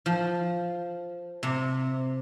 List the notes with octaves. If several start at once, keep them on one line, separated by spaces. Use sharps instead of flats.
F3
C3